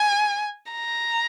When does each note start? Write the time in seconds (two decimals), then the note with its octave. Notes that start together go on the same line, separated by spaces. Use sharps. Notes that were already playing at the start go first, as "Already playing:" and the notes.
Already playing: G#5
0.72 A#5